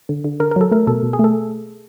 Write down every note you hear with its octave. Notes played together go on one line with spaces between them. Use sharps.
D3
D3
D3 A#4
A#4
F#3 A4
A3 A#4
B2 A4
B2
G#4
A3 A4